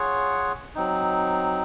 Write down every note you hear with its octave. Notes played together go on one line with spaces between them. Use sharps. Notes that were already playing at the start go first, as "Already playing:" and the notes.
Already playing: F4 G#4 C#5 F#5
F#3 C4 D#4